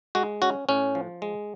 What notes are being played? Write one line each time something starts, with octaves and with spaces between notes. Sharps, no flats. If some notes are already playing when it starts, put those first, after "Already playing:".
G#3 F#4
C#4 F#4
A2 C#4
F3
G#3